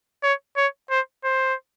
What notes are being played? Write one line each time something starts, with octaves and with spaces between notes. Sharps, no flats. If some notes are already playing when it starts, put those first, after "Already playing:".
C#5
C#5
C5
C5